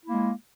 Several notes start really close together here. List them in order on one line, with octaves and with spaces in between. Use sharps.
E4 A#3 G#3